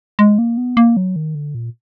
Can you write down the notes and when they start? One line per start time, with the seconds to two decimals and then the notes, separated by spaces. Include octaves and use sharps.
0.19 G#3
0.39 A#3
0.57 B3
0.77 A#3
0.97 F#3
1.16 D#3
1.35 D3
1.55 A#2